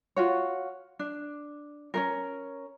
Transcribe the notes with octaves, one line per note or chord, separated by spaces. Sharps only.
F4 F#4 C#5
D4
C#4 D#4 A#4